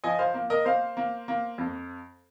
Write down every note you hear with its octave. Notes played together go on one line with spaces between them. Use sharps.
F3 D#5 G#5
C5 F5
A#3
A#4 D#5
A#3 C5 F5
A#3
A#3
F2